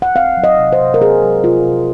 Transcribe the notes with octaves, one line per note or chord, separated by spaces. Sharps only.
F#5
C4 F5
F#3
D#5
C3
C5
C3
A#4
C4 G#4
F#3
C3 F4
C3